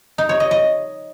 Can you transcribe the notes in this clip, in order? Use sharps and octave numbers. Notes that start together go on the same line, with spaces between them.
D#4
C#5
D#5
D#5